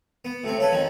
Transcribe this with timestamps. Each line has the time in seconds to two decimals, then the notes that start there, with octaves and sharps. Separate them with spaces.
0.25 B3
0.44 A2 C3 C4
0.58 C#3 A4 B4 C#5
0.72 F2 D#3 G#5